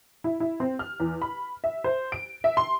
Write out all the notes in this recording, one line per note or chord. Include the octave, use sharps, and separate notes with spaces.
E4
E4
C4
F6
E2
B5
E5
C5
D7
E5
C6